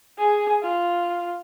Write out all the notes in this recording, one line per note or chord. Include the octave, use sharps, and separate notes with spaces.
G#4
F4